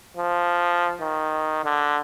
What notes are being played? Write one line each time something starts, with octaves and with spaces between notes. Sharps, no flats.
F3
D#3
D3